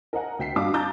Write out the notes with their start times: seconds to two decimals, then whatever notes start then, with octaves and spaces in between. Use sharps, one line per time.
0.13 A#4 D#5 F#5 G#5
0.39 D2 G5 B6 C7
0.56 G2 D4 F#4 D#5 F5 D6
0.73 A5 A#5 D6 G6 A6